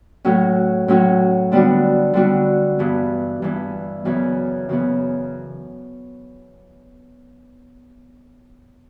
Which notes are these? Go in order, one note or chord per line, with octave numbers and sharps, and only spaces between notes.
A2 F#3 C#4 F#4
A2 F#3 C#4 F#4
D3 G3 B3 D4 F#4
D3 G3 B3 D4 F#4
G2 E3 B3
G2 E3 B3
F#2 C#3 E3 B3
F#2 C#3 E3 B3